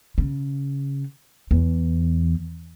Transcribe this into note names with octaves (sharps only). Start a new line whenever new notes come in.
C#3
E2